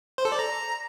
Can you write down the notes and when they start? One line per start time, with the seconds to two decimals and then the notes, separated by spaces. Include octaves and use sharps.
0.18 C5
0.25 A4
0.32 D5
0.39 A#5